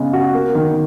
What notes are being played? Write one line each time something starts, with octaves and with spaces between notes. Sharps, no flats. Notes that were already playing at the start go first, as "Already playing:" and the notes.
Already playing: C#3 G#3 B3 D#4
F#4
A#3
D#3